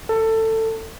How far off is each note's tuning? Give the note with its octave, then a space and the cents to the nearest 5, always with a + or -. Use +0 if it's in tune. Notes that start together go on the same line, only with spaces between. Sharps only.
A4 +20